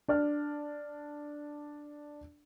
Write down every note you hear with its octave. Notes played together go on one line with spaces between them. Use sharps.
D4 D5 F6